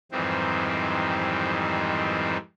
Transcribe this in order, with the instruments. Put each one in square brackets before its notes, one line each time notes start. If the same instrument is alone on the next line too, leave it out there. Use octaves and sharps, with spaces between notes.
[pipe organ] F2 G#2 D#3 E3 G3 C4